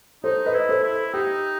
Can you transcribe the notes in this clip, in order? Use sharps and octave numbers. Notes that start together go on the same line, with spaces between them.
D#4 A4 C5
B4 D#5
E4
A4 C5
E4
D#4 G4